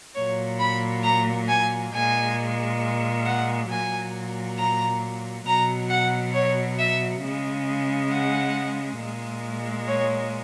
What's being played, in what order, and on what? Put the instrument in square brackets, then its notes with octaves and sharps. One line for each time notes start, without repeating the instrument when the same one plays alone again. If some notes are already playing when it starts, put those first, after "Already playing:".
[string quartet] A#2 F#3 C#5
B5
A#5
G#5
A#2 G#3 G#5
F#5
A#2 F#3 G#5
A#5
B2 F#3 A#5
F#5
C#5
E5
C#3 G#3
F#5
A#2 G#3
C#5